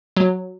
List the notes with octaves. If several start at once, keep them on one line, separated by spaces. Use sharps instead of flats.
F#3